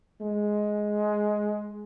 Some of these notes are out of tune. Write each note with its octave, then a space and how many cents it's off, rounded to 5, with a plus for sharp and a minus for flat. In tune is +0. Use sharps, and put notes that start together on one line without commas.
G#3 +10